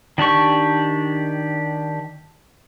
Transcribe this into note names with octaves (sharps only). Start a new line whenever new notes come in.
D#3 D4 G4 C#6